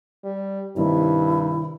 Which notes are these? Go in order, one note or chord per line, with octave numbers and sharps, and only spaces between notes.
G3
G2 C3 D#3 E4